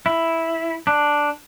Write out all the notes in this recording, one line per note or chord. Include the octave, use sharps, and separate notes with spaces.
E4
D4